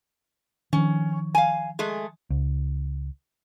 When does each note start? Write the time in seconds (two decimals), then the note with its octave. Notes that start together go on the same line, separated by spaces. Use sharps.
0.73 D#3 F3 C#4
1.35 F5 G#5
1.79 G#3 A3 G#4
2.30 C#2